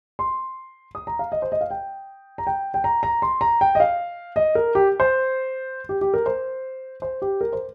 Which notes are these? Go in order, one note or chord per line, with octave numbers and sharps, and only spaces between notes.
C6
D#6
A#5
F5
D#5
C5
D#5
F5
G5
A#5
G5
G5
A#5
A#5
C6
A#5
G5
D#5
F5
D#5
A#4
G4
C5
G4
G4
A#4
C5
C5
G4
A#4
C5